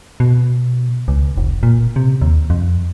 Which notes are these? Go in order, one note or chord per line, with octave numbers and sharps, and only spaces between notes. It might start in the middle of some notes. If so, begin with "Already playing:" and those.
B2
C#2
F1
A#2
C3
D#2
F2